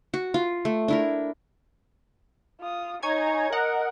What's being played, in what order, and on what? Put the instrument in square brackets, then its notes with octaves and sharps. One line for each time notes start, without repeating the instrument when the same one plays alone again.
[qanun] F#4
F4
A3
D4 E4 A#4
[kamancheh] F4 D#6
[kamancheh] D#4 A#5 [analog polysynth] C#5 G#5 G#6
[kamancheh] A#4 [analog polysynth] D#5 F#5